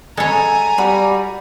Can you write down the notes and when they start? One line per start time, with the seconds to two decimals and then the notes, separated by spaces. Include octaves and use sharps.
0.17 G#3 A4 C#5 G#5 A#5 B5
0.78 G3 F#4 D5 B5